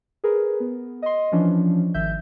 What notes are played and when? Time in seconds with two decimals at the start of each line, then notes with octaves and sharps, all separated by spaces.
0.24 G#4 A#4 B4
0.60 B3
1.02 D#5 C6
1.32 E3 F3 C#4 D4
1.94 G#1 D#3 E5 G6